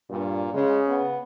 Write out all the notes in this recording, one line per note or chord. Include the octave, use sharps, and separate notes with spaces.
G2 A#2
C#3 G#3
B3